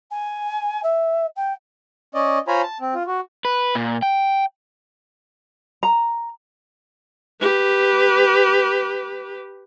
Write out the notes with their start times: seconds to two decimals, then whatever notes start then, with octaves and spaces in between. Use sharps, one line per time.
0.11 G#5
0.83 E5
1.36 G5
2.15 C#4 D5 D#5
2.48 F4 C5 C#5 G#5 A#5 B5
2.63 A5
2.81 C4
2.94 F4
3.07 F#4
3.45 B4
3.75 A#2
4.02 G5
5.83 A#5
7.41 G4 B4